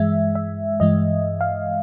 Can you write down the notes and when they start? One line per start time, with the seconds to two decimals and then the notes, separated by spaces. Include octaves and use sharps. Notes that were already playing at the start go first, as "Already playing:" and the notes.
Already playing: G2 E3 G#3 E5
0.35 E5
0.80 G2 E3 G#3 D#5
1.41 F5